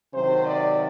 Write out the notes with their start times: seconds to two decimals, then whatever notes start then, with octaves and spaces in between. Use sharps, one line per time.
0.14 C3 D#3 F#3 C5
0.46 D5